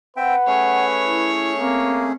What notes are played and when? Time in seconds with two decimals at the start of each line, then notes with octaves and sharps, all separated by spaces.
0.17 C4 B4 E5 F#5 G5
0.48 A3 C#4 G#4 C#5
1.05 E4
1.59 A#3 C4